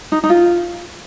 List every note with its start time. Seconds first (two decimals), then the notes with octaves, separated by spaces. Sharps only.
0.12 D#4
0.24 D#4
0.30 F4